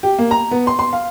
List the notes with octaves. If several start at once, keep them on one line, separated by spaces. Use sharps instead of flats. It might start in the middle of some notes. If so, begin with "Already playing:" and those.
G4
A#3
A#5
B3
C6
C6
F5